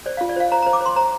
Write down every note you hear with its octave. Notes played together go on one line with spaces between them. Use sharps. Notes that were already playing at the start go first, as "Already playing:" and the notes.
C5 D5
F4 F5
D5
C5 F5
C5 A#5
C5 A#5
D6
C5 C6
C5 A#5